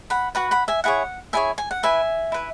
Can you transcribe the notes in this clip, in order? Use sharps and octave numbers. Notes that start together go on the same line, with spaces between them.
F#5 B5
F#4 B4 F#5 B5
F#5 B5
E5 G#5
E4 G#4 C#5 F#5
E4 G#4 C#5 E5 G#5
G#5
F#5
E4 B4 E5 G#5
E4 B4